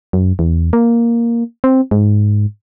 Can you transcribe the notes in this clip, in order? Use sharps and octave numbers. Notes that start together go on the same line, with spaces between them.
F#2
E2
A#3
C4
G#2